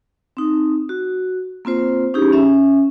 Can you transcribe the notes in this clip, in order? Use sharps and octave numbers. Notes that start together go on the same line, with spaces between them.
C4 D#4
F#4
A#3 C4 F4 C5
C#4 D#4 E4 G4 G#4
C#4 E5